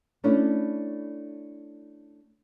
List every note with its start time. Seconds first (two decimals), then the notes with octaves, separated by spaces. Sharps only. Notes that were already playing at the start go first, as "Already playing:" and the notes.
0.24 A3 C#4 D4 E4